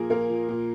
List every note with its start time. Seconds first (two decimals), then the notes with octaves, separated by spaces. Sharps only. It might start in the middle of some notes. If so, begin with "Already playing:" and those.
Already playing: A#2 F3 A#3 G#4 A#4
0.10 A#2 A#3 A#4
0.30 F3
0.49 A#2